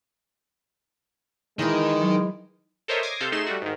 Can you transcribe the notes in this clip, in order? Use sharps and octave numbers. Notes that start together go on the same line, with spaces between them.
D#3 E3 G#3 E4 D#5
F#3
A4 A#4 C5 C#5 D#5 E5
D6 D#6 G#6 A#6 C7
C3 A4 C5 F5 G6
A3 D#4 G#4 C6 E7
G3 A3 F#4
G#2 D#3